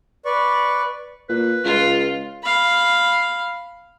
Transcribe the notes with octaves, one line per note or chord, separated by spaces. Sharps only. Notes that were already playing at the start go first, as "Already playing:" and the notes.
B4 D5 C#6
A#2 B4
C#2 F4
F5 B5